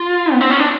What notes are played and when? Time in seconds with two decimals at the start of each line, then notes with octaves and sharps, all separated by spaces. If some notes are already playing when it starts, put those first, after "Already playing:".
Already playing: F4
0.32 B3
0.41 C4
0.50 C#4
0.59 D4